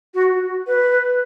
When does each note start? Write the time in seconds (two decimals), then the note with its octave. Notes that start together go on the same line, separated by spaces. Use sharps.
0.14 F#4
0.67 B4